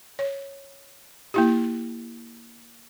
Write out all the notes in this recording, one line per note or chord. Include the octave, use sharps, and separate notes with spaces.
C#5
A#3 E4 G4